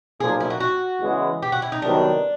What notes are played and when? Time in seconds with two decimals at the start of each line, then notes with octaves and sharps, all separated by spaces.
0.20 B1 A#2 F3 A#3 G#4
0.40 E4
0.50 F#4
0.60 F#4
1.01 E2 C#3 E3 G#3 B3
1.42 G4
1.52 F#4
1.62 E4
1.72 D#4
1.82 C2 C3 D#3 F#3 B3 D4